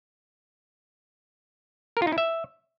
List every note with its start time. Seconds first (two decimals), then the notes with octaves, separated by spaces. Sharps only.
1.97 A#4
2.02 F4
2.07 D#4
2.12 E4
2.18 E5